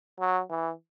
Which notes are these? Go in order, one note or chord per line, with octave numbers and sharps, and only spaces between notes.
F#3
E3